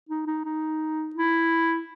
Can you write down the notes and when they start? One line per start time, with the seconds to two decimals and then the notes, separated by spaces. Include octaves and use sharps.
0.09 D#4
0.26 D#4
0.44 D#4
1.15 E4